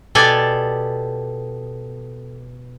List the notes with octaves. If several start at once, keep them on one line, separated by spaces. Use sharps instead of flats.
B2 G4 A4 D5 G#5